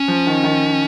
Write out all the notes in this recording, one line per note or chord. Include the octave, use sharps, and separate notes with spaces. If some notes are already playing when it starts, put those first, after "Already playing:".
Already playing: C#4
F3
D#3
D#3